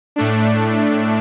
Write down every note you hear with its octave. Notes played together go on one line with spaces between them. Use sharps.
A2 A3 D4